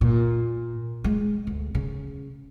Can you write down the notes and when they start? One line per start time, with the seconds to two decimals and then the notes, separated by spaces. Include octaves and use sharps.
0.01 A#2
1.04 G#3
1.47 D2
1.75 C#3